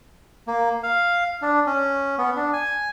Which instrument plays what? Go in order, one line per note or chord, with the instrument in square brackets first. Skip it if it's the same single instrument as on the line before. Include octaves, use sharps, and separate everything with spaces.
[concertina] A#3
F5
D4
C#4
B3
D4
G#5